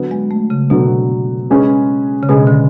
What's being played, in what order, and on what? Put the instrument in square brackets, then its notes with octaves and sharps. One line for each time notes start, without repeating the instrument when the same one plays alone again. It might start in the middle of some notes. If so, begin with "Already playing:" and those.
Already playing: [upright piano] D3 F#3 B3
[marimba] G#3
A3
C#3
[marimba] B2 [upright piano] D3 F#3 B3
[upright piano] G#3 C#4 G#4 B4
[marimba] C#3
[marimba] B2 [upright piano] G#3 C#4 G#4 B4
[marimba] D3